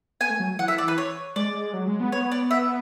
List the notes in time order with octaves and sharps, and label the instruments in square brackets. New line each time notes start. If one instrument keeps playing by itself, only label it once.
[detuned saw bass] B3 [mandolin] G#5
[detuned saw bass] A3
F#3
[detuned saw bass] E3 [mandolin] F#5
[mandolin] E5
D5
B4
C#5
[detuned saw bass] G#3 [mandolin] D5
[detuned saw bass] F#3
G#3
B3
[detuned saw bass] B3 [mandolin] C#5
[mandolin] D5
E5